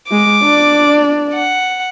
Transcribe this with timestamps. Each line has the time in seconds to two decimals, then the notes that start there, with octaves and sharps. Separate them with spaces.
0.11 G#3 D6
0.43 D4 D5
1.34 F#5